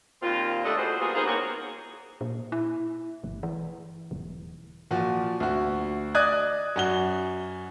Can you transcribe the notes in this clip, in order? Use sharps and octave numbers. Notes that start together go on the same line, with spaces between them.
D#2 A#2 C4 F4
G3 A3 D4 A4 D5 D#5
E3 F#4 G#4 C5
G3 A#3 B3 F4 F#4 G#4
B3 D#4 F4 G#4 A#4 C5
E2 A#3 C4 F#4 G#4 C#5
A#2
E4
G1
E3
E1
A#2 F3 F#4
D2 F#4
D5 D#5 D#6 F#6 G#6 A6
F#2 F#4 G7